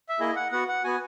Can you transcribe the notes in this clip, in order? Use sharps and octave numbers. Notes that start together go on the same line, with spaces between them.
E5
A#3 E4 G#4 D#5
F#5
B3 F#4 F#5
F#5
B3 F#4 G#5